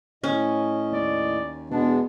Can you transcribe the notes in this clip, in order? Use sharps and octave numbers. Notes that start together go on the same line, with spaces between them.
A2 C#4 D#5
D#2 D5
E2 B2 G#3 B3 D4